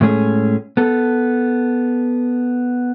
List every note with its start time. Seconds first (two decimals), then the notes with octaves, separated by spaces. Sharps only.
0.01 A2 G#3 A3 C#4 G4 G#4
0.77 B3 A4